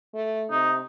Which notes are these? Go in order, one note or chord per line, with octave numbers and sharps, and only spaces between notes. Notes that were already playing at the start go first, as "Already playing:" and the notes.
A3
C3 D#4